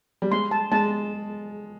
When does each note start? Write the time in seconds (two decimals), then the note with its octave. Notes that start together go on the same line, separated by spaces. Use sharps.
0.22 G3
0.31 G#3 C6
0.51 A5
0.72 G#3 A5